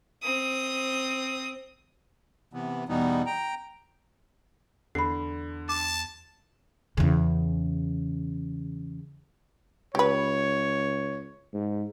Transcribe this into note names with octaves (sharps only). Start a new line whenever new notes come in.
C4 D#6
C3 E3 B3
E2 B2 E3 G3 B3 D#4
G5 A#5
E2 D3 B5 C7
A5 D6
E2 C#3
C#2 G4 B4 C#5
G#2